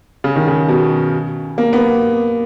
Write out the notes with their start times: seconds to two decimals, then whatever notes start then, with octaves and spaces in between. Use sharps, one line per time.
0.24 C#3
0.36 D#3
0.47 C#3
0.68 B2
1.58 A#3
1.73 B3